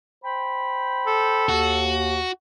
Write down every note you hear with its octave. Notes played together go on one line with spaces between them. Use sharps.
C5 G5 B5
A4
D#2 F#4